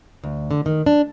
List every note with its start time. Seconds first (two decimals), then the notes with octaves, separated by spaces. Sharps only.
0.24 D2
0.51 D3
0.66 D#3
0.86 D4